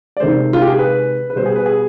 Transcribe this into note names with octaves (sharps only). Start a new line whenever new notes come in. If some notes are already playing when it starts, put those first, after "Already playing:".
D5
C3 D#3 G#3 C5
F4
G4
G#4
B4
B4
B2 G3 C5
G#4
B4
G#4